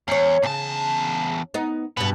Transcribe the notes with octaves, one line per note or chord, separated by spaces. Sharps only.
E2 C#4 C#5
E2 C#3 A5
B3 D#4
G2 B2 B3